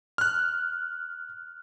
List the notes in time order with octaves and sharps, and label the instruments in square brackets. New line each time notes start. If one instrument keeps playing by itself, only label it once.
[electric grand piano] F6 F#6